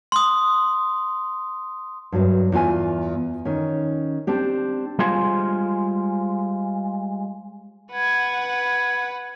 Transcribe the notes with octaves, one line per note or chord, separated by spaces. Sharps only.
C6 D#6
G2 F#3 B4
E2 F4 G#5
D#3 C#4
C4 D4 G4
G3 G#3 F4 G#4 C5
B4 F#5 G#6